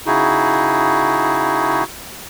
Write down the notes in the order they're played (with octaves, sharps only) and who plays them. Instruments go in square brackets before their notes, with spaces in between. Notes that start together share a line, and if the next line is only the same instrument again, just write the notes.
[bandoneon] C#3 D#4 E4 F#4 G#4